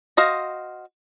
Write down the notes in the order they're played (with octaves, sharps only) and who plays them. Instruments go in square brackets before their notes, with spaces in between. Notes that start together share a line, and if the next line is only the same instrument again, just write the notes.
[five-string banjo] F#4 C5 D#5 F5